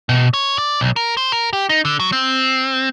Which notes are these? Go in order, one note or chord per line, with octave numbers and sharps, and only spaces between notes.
B2
C#5
D5
B1
A#4
C5
A#4
G4
D#4
D3
F#3
C4